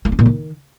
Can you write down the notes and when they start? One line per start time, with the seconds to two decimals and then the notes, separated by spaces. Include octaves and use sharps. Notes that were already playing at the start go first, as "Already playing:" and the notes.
0.05 A#3
0.12 C#4
0.19 A#2
0.26 D#3